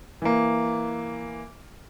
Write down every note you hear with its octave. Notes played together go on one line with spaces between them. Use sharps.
E3 A#3